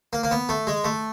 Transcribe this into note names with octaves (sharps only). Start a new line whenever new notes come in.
A#3
A#3
B3
A3
G#3
A3